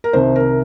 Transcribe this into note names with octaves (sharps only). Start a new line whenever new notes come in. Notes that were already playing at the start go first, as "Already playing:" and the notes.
A#4
C2 C3 D#3 C5
A#4